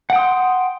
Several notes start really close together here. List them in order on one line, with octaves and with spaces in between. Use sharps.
F#5 G5 D#6 C6